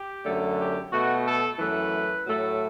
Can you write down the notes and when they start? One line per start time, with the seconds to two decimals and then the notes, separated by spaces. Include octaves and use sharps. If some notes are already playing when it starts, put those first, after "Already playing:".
Already playing: G4
0.25 F#2 D3 A3
0.59 G4
0.92 B2 A3 F#4
1.25 A4
1.58 F#2 E3 A3 B4
2.25 A2 F#3 A3